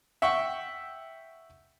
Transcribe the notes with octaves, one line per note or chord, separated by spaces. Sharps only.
E5 F#5 G5 C#6